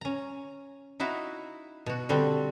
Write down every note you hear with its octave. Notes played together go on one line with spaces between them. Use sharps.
C#4 A#5
D#4 E4 F#4 E5 F5
B2 F#4
D3 G3 C4 F#4